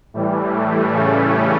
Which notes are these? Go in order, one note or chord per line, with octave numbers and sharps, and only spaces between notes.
A2 E3 G3
A3
C#3 C#4